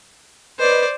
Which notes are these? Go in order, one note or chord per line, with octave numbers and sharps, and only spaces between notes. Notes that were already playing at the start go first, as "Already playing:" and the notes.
B4 C5 D5 D#5